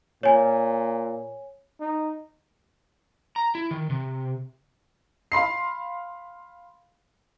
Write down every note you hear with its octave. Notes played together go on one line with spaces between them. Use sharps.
A#2 C#5 G#5
D#4
A#5
E4
D#3
C3
F5 B5 C6 C7